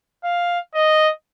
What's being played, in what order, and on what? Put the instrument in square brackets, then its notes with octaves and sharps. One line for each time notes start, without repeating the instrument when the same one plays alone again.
[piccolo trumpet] F5
D#5